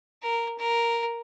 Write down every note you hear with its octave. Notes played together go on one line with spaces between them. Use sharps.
A#4
A#4